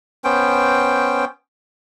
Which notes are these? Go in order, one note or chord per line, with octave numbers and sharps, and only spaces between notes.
B3 C#4 C5 G5